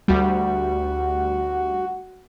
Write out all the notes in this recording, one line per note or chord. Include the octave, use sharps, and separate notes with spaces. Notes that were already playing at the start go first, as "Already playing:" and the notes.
D2 G3 F#4